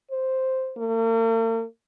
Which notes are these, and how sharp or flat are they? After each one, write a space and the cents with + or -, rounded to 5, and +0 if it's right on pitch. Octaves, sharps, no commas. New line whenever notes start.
C5 +0
A#3 -45